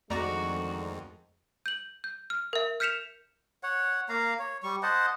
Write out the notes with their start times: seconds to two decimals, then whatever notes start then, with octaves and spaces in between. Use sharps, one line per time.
0.10 F2 D3 D#3 G#3 A3 F#4 D5 A#5
1.66 G6 F#7
2.04 G6
2.30 F6
2.53 A#4 E5
2.80 F6 G6 B6 C#7 E7 F7
3.63 C#5 F#5
4.09 A#3 F5 A#5
4.39 C#5
4.63 G3 C#6
4.83 C5 D#5 F#5 A5